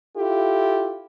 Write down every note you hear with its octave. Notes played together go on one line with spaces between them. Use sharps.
E4 F4 G4 A4